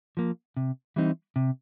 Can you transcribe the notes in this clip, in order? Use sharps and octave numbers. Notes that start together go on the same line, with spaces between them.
F3 A#3
C3
E3 G3 C4 D#4
C3